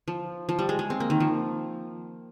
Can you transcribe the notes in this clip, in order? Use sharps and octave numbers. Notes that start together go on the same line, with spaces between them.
F3
F3
G3
G#3
G#3
C4
A#3
D#3
F3